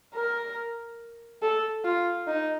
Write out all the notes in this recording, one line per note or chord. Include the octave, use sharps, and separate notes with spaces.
A#4
A4
F4
D#4